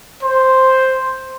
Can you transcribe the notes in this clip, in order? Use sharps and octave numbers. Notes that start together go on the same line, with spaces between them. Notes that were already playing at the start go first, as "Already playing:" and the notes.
C5